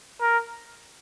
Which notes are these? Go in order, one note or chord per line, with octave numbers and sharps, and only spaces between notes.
A#4